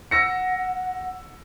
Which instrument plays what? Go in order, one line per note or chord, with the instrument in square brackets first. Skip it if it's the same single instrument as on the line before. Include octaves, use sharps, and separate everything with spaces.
[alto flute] F#5 [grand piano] E6 A#6 C#7